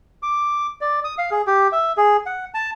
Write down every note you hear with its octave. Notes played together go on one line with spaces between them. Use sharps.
D6
D5
D#6
F5
G#4
G4
E5
G#4
F#5
A5